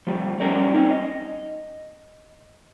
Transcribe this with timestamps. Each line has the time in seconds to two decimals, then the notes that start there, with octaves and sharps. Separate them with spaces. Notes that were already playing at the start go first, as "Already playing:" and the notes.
0.07 F3 G3 A3
0.40 G3 C#4 A4 A#4 C#5 D5
0.74 C4 C#4 D#4
0.91 D#5